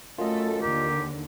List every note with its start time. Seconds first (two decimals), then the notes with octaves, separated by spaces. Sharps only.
0.18 F#2 A3 F4 A4 D#5
0.62 D#2 D3 G4 A#4